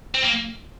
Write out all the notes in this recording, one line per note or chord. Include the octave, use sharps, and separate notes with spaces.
C4
A#3